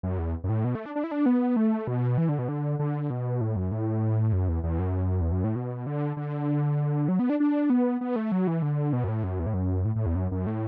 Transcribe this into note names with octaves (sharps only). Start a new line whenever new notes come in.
F#2
E2
F#2
A2
B2
A3
D4
D4
E4
D4
B3
A3
B2
E3
D3
B2
D3
D3
B2
A2
F#2
A2
F#2
E2
E2
F#2
E2
F#2
A2
B2
D3
D3
F#3
B3
D4
D4
B3
B3
A3
F#3
E3
D3
B2
F#2
A2
F#2
E2
A2
F#2
A2
A2
E2
F#2
F#2
A2